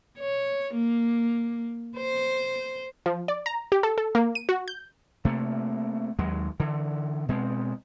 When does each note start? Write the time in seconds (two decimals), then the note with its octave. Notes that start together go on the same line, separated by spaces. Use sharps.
0.18 C#5
0.74 A#3
1.97 C5
3.06 F3
3.28 D5
3.46 A#5
3.72 G4
3.83 A4
3.98 A4
4.15 A#3
4.35 D#7
4.49 F#4
4.68 G6
5.25 C3 A3 A#3
6.19 D#2 F#3 G#3
6.60 D3 E3
7.29 B2 G#3 C4